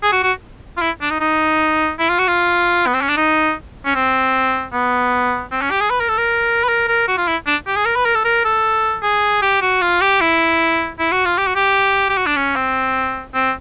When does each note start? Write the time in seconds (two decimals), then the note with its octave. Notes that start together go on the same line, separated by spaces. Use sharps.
0.03 G#4
0.12 F#4
0.23 F#4
0.78 F4
0.82 E4
1.01 D4
1.10 D#4
1.21 D#4
1.99 E4
2.09 F4
2.19 F#4
2.28 F4
2.87 B3
2.94 C4
3.02 C#4
3.09 D4
3.17 D#4
3.86 C#4
3.95 C4
4.73 B3
5.52 C4
5.62 C#4
5.71 G4
5.81 G#4
5.90 B4
6.00 A#4
6.09 A4
6.18 A#4
6.64 B4
6.69 A#4
6.88 A#4
7.08 F#4
7.17 F4
7.28 E4
7.47 D4
7.67 G4
7.76 G#4
7.86 A#4
7.96 B4
8.05 A#4
8.15 A4
8.25 A#4
8.45 A4
9.03 G#4
9.42 G4
9.62 F#4
9.82 F4
10.01 G4
10.21 E4
10.99 E4
11.12 F#4
11.25 F4
11.38 G4
11.47 F#4
11.55 G4
12.09 G4
12.17 F#4
12.26 D4
12.37 C#4
12.56 C4
13.34 C4